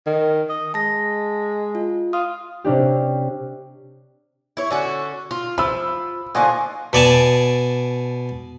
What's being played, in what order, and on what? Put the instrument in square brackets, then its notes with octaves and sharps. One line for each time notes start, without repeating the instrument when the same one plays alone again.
[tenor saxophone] D#3
D#5
[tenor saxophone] G#3 [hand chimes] A5 A#6
[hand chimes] F4
[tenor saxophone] F4 [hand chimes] D#6
[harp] C3 C#4 D4 G4
[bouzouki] E4 C#5
D3 C#4 F#4
F4
[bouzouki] F3 [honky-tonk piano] B5 E6
[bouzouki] D3 A#3 D#4 [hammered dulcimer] F3 F#4 G#5
[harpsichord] B2 D5 G#5 A5